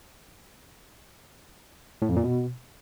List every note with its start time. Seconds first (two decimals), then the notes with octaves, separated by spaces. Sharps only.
2.02 A2
2.09 F2
2.16 A#2
2.24 B2